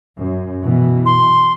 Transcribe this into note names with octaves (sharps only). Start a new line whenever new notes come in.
F#2
B2 E3
C6